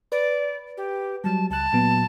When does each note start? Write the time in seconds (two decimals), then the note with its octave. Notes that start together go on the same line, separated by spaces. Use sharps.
0.12 B4 D5
0.77 G4
1.24 F#3 G3 A5
1.50 C#2 A5 F#6
1.73 A#2 F#3 B3